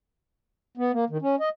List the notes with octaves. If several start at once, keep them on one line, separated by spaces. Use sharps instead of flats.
B3
A#3
D#3
C#4
D#5